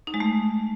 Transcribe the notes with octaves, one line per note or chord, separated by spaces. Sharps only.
D#4
G#3
A3